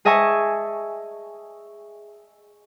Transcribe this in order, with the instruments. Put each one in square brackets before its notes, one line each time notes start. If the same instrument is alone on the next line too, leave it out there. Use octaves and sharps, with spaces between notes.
[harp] G#4 D#5 E5 G#5 A5 C#6